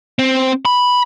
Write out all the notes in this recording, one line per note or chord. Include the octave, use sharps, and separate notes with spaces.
C4
B5